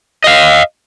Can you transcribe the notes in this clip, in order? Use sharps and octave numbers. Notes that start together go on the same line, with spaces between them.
D#5 F5